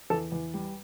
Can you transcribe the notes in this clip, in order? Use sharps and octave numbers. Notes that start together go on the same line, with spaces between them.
E2 A4
E2
G3